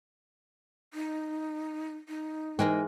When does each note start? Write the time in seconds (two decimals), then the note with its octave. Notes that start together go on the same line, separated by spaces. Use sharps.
0.94 D#4
2.08 D#4
2.59 G#2 E3 G#3 A#4 G5 G#5